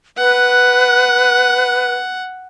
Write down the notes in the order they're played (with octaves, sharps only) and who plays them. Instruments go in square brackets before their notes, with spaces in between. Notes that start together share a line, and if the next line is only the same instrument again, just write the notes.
[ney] B4 [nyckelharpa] F#5